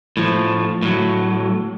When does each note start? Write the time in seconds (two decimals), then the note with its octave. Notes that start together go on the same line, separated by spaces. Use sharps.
0.17 A2 F3
0.82 A2 F#3